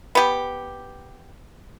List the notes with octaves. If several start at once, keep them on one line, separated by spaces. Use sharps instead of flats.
B3 G4